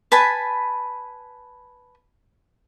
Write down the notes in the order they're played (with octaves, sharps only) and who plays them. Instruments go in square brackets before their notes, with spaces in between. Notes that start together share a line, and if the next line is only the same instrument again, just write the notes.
[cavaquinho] B4 G#5 A5 B5